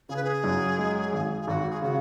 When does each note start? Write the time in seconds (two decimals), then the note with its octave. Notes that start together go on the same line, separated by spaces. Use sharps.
0.09 C#3 G#4
0.16 B4
0.24 G#4
0.44 F#2
0.78 G#3
1.13 G#1
1.41 G#4
1.48 G#1 F#4
1.70 G#4
1.82 C#3 F#4